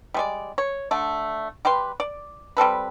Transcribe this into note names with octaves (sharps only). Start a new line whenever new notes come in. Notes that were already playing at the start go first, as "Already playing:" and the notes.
G3 G#3 D5
C#5
D3 A3
G3 G4 B4 C6
D5
G3 C4 A4 B4